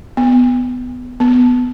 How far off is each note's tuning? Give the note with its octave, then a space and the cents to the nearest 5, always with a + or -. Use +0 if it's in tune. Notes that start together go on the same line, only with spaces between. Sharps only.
B3 +15
B3 +10